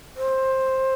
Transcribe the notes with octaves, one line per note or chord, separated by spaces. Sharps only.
C5